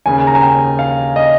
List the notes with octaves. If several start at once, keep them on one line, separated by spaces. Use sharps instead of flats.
D#2 C#3 G#5
A#5
G#5
G5
F5
D#5